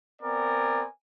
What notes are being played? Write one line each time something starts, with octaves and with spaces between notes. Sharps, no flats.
B3 C4 A#4 D5 G#5